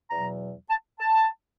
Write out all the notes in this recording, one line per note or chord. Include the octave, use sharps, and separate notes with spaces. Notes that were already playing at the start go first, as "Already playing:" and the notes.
E2 B2 F#3 A#5
A5
A5